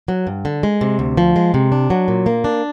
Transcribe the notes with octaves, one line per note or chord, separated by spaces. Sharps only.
F#3
G2
D3
G#3
C3
D2
F3
G#3
C3
D4
F#3
A#2
A#3
D4